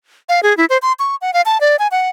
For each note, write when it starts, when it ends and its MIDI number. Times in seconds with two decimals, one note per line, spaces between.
0.29 0.40 77
0.43 0.56 68
0.57 0.65 64
0.70 0.78 72
0.82 0.93 84
0.99 1.16 85
1.21 1.33 78
1.33 1.41 77
1.46 1.60 81
1.61 1.76 74
1.79 1.88 80
1.91 2.10 78